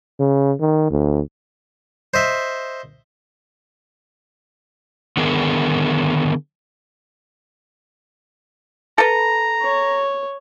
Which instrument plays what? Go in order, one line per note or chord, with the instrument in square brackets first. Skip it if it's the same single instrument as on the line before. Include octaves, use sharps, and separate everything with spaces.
[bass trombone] C#3
D#3
D2
[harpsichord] C5 D#5 E5
[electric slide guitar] D3 D#3 B3 G#4 A#4
[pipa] A4 B4 [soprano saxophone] A#5
[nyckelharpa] C#5